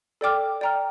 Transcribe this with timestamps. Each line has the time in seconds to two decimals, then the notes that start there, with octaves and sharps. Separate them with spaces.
0.21 A4 D5 G5 D6 F6
0.61 D5 G5 A#5 F6